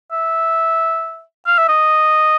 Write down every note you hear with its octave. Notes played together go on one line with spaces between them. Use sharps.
E5
F5
E5
D#5